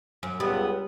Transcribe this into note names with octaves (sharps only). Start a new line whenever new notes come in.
F#2
C#2 G3 B3 D#6